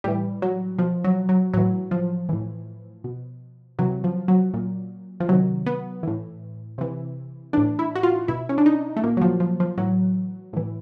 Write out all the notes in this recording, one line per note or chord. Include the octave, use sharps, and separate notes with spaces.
A2 E3 G3
F#3
B2 F3
F#3
F#3
A2 E3 F#3
F3
A2 E3
B2
C3 E3 F#3
F3
F#3
A#2
F3
C3 D#3 F#3
B3
A2 E3
C3 E3
A2 E3 D4
E4
F#4
F4
B2 E4
C#4
D4
D#4
A3
A#2 A#3
F#3
F3
F3
F3
A2 E3 F#3
A2 E3